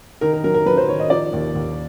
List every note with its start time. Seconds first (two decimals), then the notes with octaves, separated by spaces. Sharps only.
0.21 D#3 A#4
0.33 A#4
0.44 F#3 A#4
0.54 A#4
0.66 F#3 B4
0.77 C5
0.88 D#3 C#5
1.00 D#5
1.10 F3 D5
1.33 D#2
1.55 D#2